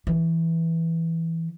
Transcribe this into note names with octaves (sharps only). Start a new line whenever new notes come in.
E3